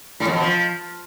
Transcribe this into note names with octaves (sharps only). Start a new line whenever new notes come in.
A2
F2
B2
F3